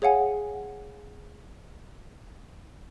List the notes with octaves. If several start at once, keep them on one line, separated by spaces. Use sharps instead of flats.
G#4 C#5 F5 F#5 G#5